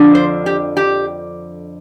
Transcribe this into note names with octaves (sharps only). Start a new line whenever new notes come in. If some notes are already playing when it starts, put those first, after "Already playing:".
Already playing: F2 D3 F3 D4
C5
G4
G4